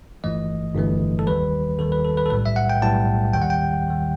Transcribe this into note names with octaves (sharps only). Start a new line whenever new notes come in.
G1 G2 E3 A3 D#5
G1 G2 E3 A3
A4
D#2 D#3 G3 B4
D#2 D#3 G3 A4
B4
A4
B4
A4
B1 A2 G3 B4
E5
F#5
G5
B1 A2 G3 A5
D#2 D#3 G3 G5
F#5
G5
D#2 D#3 G3